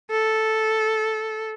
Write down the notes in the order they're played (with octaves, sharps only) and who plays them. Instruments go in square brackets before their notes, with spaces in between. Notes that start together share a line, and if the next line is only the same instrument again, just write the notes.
[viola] A4